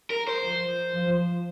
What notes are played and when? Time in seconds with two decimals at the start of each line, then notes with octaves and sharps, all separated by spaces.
0.10 A#4
0.28 C5
0.43 F3
0.94 F3